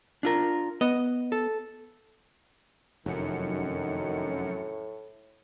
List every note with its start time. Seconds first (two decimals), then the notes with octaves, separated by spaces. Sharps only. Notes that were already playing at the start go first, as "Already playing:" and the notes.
0.23 D4 F4 A#4
0.81 B3 D#5
1.32 A4
3.06 F1 F#2 A2 D#3 C#7